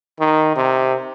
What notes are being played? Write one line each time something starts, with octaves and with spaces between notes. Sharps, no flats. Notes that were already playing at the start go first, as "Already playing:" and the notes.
D#3
C3